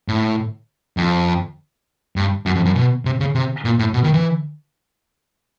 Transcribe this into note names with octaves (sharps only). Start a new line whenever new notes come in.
A2
F2
G2
F#2
F2
F#2
B2
C3
C#3
C3
A#2
A2
B2
D#3
E3